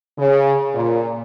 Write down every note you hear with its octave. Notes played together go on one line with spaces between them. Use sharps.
C#3
A#2